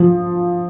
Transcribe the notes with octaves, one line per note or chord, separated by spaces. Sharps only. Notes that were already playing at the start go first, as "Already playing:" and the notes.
Already playing: F3